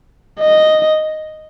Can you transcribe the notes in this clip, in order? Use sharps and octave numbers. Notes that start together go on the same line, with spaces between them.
D#5